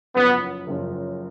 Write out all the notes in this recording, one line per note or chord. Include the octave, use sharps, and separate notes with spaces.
F#1 F#2 F3 B3
F#1 F#2 F3